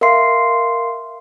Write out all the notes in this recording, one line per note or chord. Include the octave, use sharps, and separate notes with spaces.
A#4 E5 F5 C6 C7